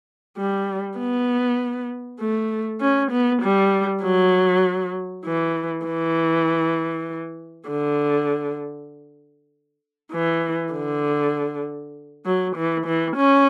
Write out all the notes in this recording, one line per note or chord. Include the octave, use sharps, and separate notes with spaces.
G3
B3
A3
C#4
B3
G3
F#3
E3
E3
D3
E3
D3
F#3
E3
E3
C#4